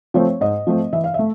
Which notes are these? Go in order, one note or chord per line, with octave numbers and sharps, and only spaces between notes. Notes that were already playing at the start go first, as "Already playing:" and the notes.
F3 A3 C4 C#5
G#2 D#5
F3 A3 C4
E3 E5
F5
A3 E5